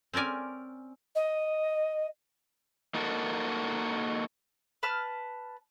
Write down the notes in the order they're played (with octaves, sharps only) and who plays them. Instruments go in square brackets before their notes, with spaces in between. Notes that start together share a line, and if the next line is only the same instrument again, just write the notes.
[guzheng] C4 C#4 A#4 D5 G#5
[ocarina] D#5
[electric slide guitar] A#3 D#4 F#4 A4 A#4
[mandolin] B4 A5 F6